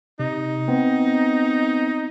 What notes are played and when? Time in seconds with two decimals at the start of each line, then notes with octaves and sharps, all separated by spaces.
0.20 C3 D#4
0.68 B3 C4